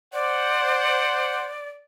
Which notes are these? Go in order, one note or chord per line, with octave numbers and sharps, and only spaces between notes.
C5 D5 F#5